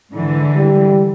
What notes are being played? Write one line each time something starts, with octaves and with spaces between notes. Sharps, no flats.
G#2 D3 E3
G3